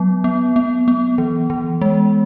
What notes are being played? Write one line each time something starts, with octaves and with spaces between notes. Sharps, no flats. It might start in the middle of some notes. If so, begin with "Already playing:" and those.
Already playing: F#3 B3
B3
B3
B3
E3
E3
G#3